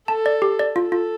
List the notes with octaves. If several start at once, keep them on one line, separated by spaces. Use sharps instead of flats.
A4 A5
D5
G4
D5
F4 A4
F4